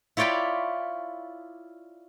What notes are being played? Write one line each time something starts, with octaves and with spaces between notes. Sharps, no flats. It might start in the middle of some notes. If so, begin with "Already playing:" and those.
E4 F4 C#5 D5 G5 B5